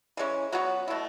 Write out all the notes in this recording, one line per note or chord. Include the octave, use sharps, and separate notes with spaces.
E3 G#3 C#4
F#3 B3 F#4 B4
B2 A3 E4